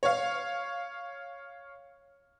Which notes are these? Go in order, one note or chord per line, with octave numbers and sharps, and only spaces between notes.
C#5 F5